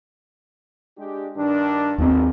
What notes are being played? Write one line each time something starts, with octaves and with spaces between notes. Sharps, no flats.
G#3 D4 G4
G2 D#3 D4
G#1 D#2 A3 C4